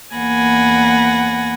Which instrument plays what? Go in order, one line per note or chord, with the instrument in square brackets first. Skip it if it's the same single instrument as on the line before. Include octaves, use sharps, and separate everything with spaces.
[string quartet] E2 A#3 F#5 G#5 B5 A#6